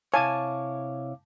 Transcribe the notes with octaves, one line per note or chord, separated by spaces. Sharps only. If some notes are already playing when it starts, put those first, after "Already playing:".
C3 E4 C#5 F5 G#5 A5 D6